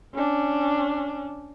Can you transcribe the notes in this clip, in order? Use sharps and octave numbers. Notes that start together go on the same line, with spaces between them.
C#4 D4